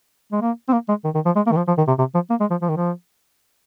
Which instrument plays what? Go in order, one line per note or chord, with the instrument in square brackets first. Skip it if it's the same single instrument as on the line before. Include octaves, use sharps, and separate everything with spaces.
[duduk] G#3
A#3
C4
A#3
G#3
D#3
D#3
F3
G#3
A#3
D#3
F3
F3
D#3
C3
C3
F3
A#3
G#3
F3
F3
D#3
F3